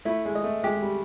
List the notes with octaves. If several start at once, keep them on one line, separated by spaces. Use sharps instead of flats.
A3 E4
G#3
D#5
A3
G#3 G4
G3